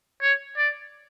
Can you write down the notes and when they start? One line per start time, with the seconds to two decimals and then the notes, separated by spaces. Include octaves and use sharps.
0.22 C#5
0.57 D5